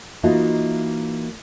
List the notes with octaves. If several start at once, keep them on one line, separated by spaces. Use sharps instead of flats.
E3 A#3 D#4 F4 F#4 D#5